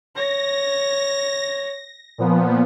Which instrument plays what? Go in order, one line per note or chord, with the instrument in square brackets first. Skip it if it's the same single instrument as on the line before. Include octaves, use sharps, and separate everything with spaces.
[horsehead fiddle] C#5 [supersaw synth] A#6
[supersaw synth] A#2 F3 B3